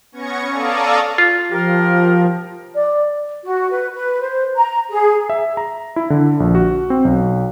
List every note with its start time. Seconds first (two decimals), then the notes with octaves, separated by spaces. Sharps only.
0.12 B3 C#4 C#6 G#6 A#6 C#7
0.49 A4 D5 F5 A#5 C#6 D#6
1.18 F4
1.51 F3 G4 A#4
2.75 D5
3.44 F#4
3.71 B4
3.94 B4
4.21 C5
4.57 A#5
4.90 G#4
5.30 E5
5.57 A#5
5.96 E4
6.10 D3
6.40 A#1
6.55 F#4
6.90 C4
7.05 B1